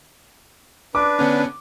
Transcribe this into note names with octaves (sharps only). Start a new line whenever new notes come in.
D4 B4 D6
D3 B3 C#4